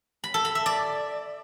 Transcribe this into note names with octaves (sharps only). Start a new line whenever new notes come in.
B5
A4
B5
E5
D5